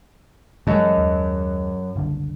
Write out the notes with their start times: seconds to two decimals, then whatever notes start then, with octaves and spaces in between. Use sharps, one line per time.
0.67 F#2 E3 F#3 G#3 D#5 A5
0.97 D#2
1.96 F#1 C2 D3